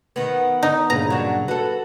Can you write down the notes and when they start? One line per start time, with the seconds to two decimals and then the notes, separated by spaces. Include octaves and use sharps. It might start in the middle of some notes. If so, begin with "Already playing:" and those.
0.16 D#3 B3
0.63 D#4
0.90 G2 A#2 C#3 B4 A#5
1.10 F#3 D4
1.48 F#4 A4 B4